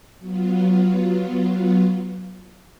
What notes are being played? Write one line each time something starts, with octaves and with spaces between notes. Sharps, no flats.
F#3 B3 F4